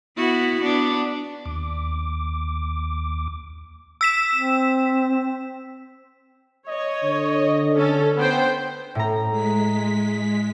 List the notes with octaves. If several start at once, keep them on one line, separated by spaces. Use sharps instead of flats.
B3 E4 F#4
B3 D4
D#2 D6
E6 B6 E7
C4
C#5 D#5
D3
C#4 A4
B3 C5 G5
A2 A#5
G#3 B6